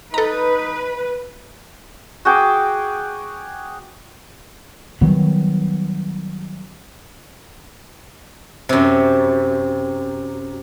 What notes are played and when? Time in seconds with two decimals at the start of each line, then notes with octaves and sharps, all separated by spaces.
0.14 D#4 A4 B4 A#5
2.25 F#4 G#4 G5 D6
5.01 D#3 F#3 G3 B3
8.69 F#2 C3